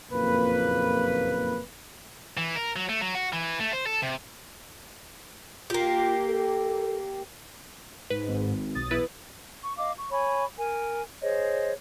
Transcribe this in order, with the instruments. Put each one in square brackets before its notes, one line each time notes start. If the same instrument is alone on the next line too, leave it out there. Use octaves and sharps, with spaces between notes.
[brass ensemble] F#1 F2 A#2 A#3 B4
[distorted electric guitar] E3
A#4
F#3
A3
F#3
F#4
E3
A3
C5
A4
C3
[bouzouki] A#3 G4 [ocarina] F4
[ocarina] A4
[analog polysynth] G#2 [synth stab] B4
[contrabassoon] G#1
[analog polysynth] B1 D#6 A6
[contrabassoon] E2 [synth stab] E4 B4
[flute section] C#6
D#5 F5 D6
C#6
C#5 G#5 B5 C#6
A#4 G#5
G#4 C5 C#5 D#5